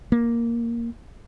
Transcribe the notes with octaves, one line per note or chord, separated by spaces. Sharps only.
A#3